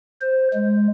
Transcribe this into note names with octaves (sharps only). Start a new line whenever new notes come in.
C5
G#3